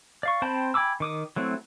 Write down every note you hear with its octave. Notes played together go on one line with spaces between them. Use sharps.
D5 F5 C#6
C4 C5 G5 A5 B5
G5 G#5 B5 D6 E6
D#3 D6 D#6
F#3 A3 C4 E4